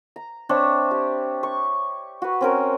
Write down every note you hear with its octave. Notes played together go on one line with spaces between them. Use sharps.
A#5
C4 D4 C#5 E5
G4
C#6
F#4 B4
C4 C#4 A#4